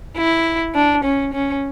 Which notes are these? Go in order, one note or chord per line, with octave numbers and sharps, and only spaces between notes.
E4
D4
C#4
C#4